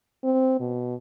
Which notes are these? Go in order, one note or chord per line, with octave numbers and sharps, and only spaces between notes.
C4
B2